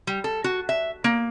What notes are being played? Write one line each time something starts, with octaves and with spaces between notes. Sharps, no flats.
G3
A4
F#4
E5
A#3